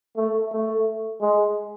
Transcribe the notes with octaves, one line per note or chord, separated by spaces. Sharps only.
A3
A3
G#3